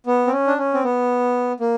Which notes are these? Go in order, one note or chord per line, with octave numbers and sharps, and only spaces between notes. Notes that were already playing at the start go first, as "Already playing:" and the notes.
B3
C4
C#4
D4
C#4
C4
B3
A#3